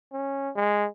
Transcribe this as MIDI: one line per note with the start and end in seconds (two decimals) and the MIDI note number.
0.13 0.50 61
0.56 0.87 56